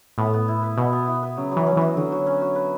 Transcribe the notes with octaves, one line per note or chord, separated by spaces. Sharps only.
A2 B3
B3
E4
B4
B2 B3
B3
E4
B4
C#3 F#3
F#3
E3
C#4
E3 F#4
D3 F#3
F#3
C#4
F#4
B4